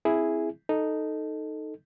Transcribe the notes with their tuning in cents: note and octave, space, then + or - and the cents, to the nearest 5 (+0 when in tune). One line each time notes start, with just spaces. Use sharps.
C4 +0 E4 +0 G#4 +0
D#4 +0 A4 +0